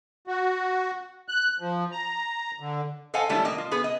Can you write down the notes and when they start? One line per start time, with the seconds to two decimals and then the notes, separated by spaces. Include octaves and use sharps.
0.27 F#4
1.29 F#6
1.60 F3
1.92 A#5
2.60 D3
3.14 A4 C5 D#5 F5 F#5 G#5
3.29 D#3 F#3 G3 A3 D4 E4
3.45 A#3 D#5
3.58 F4
3.71 B3 G#4 B4
3.84 D#5